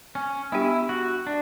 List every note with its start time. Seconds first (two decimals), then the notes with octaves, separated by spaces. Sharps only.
0.15 C#4
0.52 G3 B3 D4 E4 G4
0.89 F#4
1.27 D4